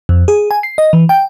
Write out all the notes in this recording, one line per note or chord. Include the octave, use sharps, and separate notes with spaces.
F2
G#4
G#5
C7
D#5
E3
G5